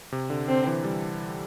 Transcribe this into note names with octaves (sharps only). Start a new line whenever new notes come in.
C3
D3
D3 C4
E3
G3